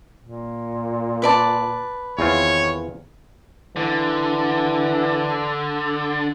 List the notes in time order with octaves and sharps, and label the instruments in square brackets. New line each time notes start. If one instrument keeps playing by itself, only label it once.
[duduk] A#2
[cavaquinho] B4 D5 A5
[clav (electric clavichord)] E2 C4 F4 [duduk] D#3 [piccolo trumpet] C#5
[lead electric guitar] D3 [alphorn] E3